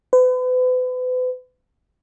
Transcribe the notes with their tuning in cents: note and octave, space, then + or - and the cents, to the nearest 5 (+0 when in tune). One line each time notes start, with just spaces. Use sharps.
B4 +40